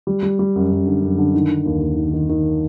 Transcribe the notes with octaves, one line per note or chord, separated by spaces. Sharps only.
G3
G3
G3
F#2
F#2
D3
F#2
D3
D#3
D#3
D#2
D#2
D#3
D#3
D#3